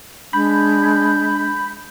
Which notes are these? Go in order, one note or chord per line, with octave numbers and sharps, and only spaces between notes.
G#3 D4 B5 G6